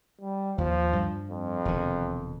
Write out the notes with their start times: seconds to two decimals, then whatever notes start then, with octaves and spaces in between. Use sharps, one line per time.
0.21 G3
0.58 D#2 F3
0.93 G2 G3
1.31 F2
1.65 E1 C3 D#3